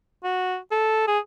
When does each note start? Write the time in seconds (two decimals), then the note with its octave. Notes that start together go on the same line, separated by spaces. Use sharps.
0.24 F#4
0.71 A4
1.08 G#4